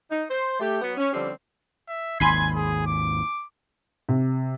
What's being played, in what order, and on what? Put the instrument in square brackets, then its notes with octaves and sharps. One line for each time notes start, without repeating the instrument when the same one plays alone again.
[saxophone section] D#4
C5
A3 G4
F#3 B3
C#4
D3 F3 G3 C4 C#4 G4
[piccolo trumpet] E5
[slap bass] G#1 D#2 [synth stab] G#5 B5 C6 [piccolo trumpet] G#6
[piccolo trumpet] G#4
D6
[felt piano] C3